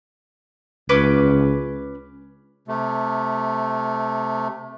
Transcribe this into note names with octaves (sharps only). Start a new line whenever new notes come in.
C#2 C#4 B4 D6
C3 A3